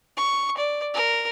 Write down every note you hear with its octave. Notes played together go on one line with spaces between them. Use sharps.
C#6
D5
A#4